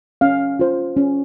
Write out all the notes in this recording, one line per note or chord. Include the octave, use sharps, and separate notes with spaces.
C#4 F5
F4 C5
C#4